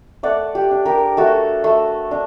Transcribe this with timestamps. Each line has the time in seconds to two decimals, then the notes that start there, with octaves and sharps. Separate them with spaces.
0.23 A3 D5 F#5
0.55 G4
0.71 D4
0.85 G4 A#4
1.17 A3 F#4 A4
1.64 A3
2.11 D4